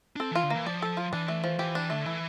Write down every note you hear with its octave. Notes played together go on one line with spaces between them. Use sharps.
D4
C4 A4
E3 F4
D3
E3 A#3
F3 D5
A4
F4
E3 D4
A3
F3
E3 G4
D4
D3 A3
E3 E4